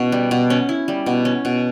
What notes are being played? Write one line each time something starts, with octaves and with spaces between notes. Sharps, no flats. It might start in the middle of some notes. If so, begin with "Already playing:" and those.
Already playing: B2 C#4 E4
G3
B2
C#4
E4
G3
B2
C#4
B2